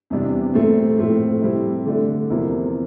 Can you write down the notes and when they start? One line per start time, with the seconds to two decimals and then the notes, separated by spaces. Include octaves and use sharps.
0.10 E2 C3 G3 D4
0.54 A#2 A3 C4
0.98 A2 F3 A3 C4
1.42 C3 G3 C4 E4
1.86 D3 A3 D4
2.30 E2 C3 F3 A#3 E4